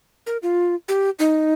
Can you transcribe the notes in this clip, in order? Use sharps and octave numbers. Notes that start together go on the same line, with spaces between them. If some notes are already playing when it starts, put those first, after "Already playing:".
A#4
F4
G4
D#4